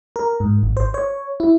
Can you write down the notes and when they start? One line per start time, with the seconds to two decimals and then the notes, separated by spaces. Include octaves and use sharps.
0.16 A#4
0.40 G#2
0.63 G#1
0.77 C5
0.94 C#5
1.40 E4